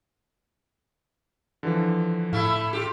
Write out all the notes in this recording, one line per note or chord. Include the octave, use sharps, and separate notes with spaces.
D3 E3 F3
A2 A3 E4 F5
F4 G4